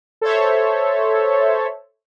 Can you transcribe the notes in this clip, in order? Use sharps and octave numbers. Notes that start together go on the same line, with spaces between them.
A4 C5 C#5 E5